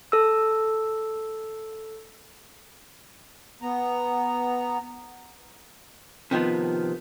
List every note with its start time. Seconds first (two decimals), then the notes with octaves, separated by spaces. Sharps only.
0.12 A4 E6
3.62 B3 A#5
6.31 C3 D#3 F3 B3